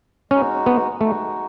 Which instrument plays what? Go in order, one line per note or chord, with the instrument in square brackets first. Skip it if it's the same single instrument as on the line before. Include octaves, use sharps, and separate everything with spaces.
[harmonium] G#3 D#4 F#4 [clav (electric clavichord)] C#4
[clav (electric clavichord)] B3
[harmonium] G#3 D#4 F#4 [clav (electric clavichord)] A3